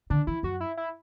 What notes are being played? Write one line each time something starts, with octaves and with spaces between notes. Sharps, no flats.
D3 D4
E3 E4
F#2 F#4
E4
E4